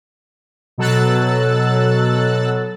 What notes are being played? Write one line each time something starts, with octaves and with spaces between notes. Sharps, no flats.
B2 F#3 A4 E6 F#6 A6